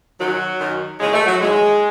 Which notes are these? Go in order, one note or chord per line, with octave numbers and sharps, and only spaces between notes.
F#2 D#3 F#3
F#2 D#3
D#2 C#3 E3 G#3
A3
F#3
D#2 C#3 E3 G#3